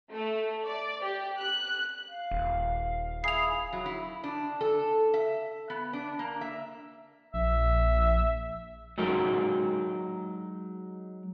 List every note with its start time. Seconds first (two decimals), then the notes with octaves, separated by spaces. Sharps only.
0.12 A3
0.66 D5
1.03 G4
1.39 F#6
2.08 F5
2.31 D#1
3.24 E4 G#4 C7 F7
3.73 F#3
3.86 E4
4.24 D4
4.61 A4
5.14 E5
5.70 B3
5.93 D4
6.19 A#3
6.41 E5
7.34 A#1 E5
8.98 F#3 G#3 D#4 F#4 A#4